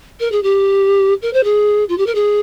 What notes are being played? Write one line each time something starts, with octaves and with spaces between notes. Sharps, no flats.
A#4
G#4
G4
A#4
C5
G#4
F4
G4
A#4
G#4